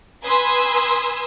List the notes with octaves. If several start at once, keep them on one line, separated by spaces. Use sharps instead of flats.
B4 G#5 C6 D#6 E6 G#6